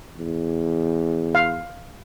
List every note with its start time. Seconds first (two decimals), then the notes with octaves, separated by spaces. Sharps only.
0.17 E2
1.35 F5